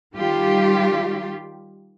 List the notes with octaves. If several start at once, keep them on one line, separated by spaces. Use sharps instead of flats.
D#3 G3 F4 G4